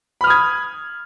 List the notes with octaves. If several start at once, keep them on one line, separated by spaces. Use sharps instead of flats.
B5 D#6 F6 G#6